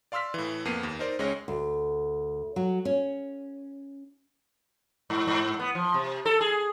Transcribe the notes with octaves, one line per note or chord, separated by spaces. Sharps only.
D5 F5 C6 E6 F6 B6
A2 E3
F2 A#3 B3 C7 D#7
D#2
D#4 A#4 C5 D5
C#2 G#3 C#4 C#5 A#6
D2
F#3
C#4
G#2
G#2
B3
F3
C3
A4
G#4